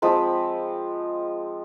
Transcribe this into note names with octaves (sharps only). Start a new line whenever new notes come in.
F3 G#3 C4 B5